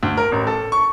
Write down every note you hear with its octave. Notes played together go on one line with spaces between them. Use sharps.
D2
A#4
A1
A4
C#6